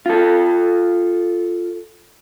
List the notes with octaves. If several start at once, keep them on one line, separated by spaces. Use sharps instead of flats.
F4 A4